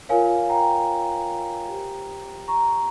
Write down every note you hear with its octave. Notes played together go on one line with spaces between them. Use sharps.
F4 A#4 C#5 F5 G#5
G5 A#5
G4 C5
A#5 C#6